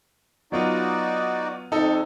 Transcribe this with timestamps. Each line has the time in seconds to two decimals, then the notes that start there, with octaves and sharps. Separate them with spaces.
0.52 F#3 B3 D#4 F4 F#4 D5
1.72 F2 C3 D#4 A4